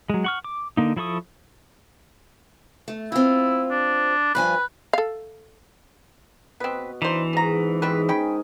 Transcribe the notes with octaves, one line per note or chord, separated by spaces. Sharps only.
F#3 G#3
F#5 C#6 F6
D6
D3 A#3 D#4
F3 E4 A4 C#6 D#6
A3
C4 E4 F4
D4
G2 F3 B4 G#5
A4 F5
B2 C4 B4
E3 D4 D#4 C5
G#2 F#4 G#4 A#5
G#2 G3 C4 D#4 B4
C#4 A#4 D#5 G5 G#5 B5